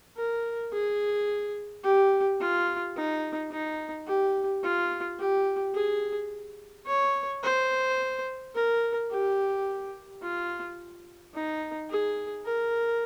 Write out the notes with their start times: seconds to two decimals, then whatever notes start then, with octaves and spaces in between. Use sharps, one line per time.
0.16 A#4
0.72 G#4
1.84 G4
2.40 F4
2.96 D#4
3.51 D#4
4.07 G4
4.63 F4
5.19 G4
5.75 G#4
6.87 C#5
7.43 C5
8.55 A#4
9.11 G4
10.22 F4
11.34 D#4
11.90 G#4
12.45 A#4